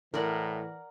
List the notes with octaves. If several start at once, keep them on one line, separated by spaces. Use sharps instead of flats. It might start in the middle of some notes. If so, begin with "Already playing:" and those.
A2 E3 A#4 D5 F#5